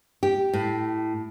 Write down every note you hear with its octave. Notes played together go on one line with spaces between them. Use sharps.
G4
A2